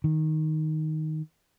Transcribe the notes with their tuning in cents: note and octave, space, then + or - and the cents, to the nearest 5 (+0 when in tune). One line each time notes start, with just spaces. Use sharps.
D#3 +5